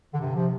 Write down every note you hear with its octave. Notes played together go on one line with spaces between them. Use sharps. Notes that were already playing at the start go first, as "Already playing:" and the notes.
D3
G2 C3
C3 F3